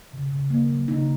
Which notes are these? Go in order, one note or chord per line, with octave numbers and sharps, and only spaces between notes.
C#3
C#3
A#3
F#3
C#3 D#4